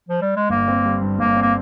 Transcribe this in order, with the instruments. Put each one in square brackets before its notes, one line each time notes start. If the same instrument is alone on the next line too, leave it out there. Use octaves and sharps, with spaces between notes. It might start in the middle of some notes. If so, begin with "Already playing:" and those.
[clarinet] F3
G3
G#3
[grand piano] G1 [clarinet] A#3
[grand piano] C4
G3
G2
[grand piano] G1 [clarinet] A#3
[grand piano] C4
[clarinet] A#3